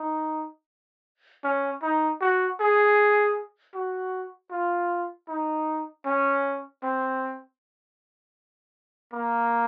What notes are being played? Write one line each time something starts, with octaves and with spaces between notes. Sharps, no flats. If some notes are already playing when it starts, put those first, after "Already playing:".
Already playing: D#4
C#4
D#4
F#4
G#4
F#4
F4
D#4
C#4
C4
A#3